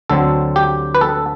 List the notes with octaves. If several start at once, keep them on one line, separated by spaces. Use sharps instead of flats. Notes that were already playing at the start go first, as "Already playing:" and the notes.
D2 D3 F#3 C4 A4
G4
B4
A4